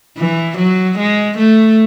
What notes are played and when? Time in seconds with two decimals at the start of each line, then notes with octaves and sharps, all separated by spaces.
0.18 E3
0.58 F#3
0.99 G#3
1.38 A3